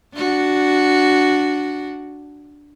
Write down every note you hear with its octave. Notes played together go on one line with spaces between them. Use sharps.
D4 F#4